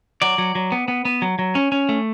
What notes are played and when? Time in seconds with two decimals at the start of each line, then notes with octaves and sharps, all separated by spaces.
0.22 F#3 D5
0.38 F#3
0.55 F#3
0.72 B3
0.88 B3
1.05 B3
1.22 F#3
1.39 F#3
1.55 C#4
1.72 C#4
1.89 A3